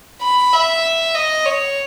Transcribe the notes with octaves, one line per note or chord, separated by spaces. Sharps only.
B5
E5
D#5
C#5